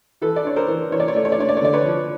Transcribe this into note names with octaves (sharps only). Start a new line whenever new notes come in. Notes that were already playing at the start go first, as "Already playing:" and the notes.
E3 A4 B4
D5
D4 C#5
A#4 C5
E3
E3 C#5
D5
C#5
A3 D5
C#5
D5
D4 C#5
D5
C#5
D3 D5
B4 C#5
F3